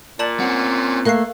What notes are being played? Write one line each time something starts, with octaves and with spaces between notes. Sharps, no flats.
A#2 D5 A5 F#7
C4 C#4 F#5
A3 A#3 F5 F#6 C7